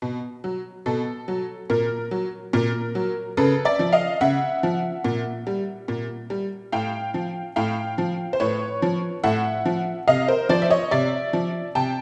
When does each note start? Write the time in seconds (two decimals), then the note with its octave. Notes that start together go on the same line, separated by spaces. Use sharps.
0.02 B2
0.44 F#3
0.86 B2 A4
1.28 F#3
1.70 A#2 A#4
2.11 F#3
2.53 A#2 A#4
2.95 F#3
3.37 C#3 A4 B4
3.65 D5 E5
3.79 F3
3.93 D#5 F5
4.21 C#3 E5 F#5
4.63 F3
5.04 A#2
5.47 G3
5.88 A#2
6.30 G3
6.72 A2 F5 G5
7.14 F3
7.56 A2 F5 G5
7.98 F3
8.33 C5
8.40 A2 B4 C#5
8.82 F3
9.24 A2 E5 F#5
9.65 F3
10.08 C3 D#5 F5
10.28 A#4 C5
10.49 F3 C5 D5
10.62 E5
10.70 C#5 D#5
10.91 C3 D5 E5
11.33 F3
11.75 C3 G5 A5